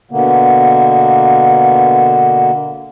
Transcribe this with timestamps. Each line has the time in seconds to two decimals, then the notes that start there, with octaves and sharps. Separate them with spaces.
0.11 B2 D3 A#3 B3